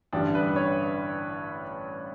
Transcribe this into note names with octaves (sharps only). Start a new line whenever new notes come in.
A1 G2 D3 G3 D4
B4
C#5